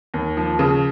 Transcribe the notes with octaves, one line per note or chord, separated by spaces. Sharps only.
D#2
F3
C#3